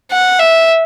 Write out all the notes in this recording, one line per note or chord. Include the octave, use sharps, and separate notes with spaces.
F#5
E5